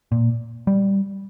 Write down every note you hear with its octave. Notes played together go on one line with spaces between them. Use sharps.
A#2
G3